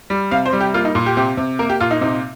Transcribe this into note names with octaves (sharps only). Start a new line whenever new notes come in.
G3
C3 F5
C5
G3
G4
A#3 F4
D#4
A#2
G4
C3 G4
C3
A#3 A#4
G4
A#2 F4
D#4
C3 D#4